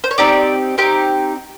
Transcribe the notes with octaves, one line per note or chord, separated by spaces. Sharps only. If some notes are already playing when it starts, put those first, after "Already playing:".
C5
C#5
C4 D#4 G4 D5
C4 D#4 G4